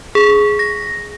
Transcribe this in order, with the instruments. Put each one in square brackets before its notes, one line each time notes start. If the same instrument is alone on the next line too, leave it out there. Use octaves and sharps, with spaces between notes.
[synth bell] G#4
A#6